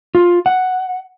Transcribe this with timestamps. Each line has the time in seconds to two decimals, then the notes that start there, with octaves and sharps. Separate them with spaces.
0.15 F4
0.46 F#5